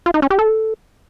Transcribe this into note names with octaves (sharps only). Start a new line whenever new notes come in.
F4
D#4
C#4
G4
A4